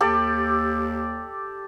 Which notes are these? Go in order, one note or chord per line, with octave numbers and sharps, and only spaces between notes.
D#2 G4 A4 D5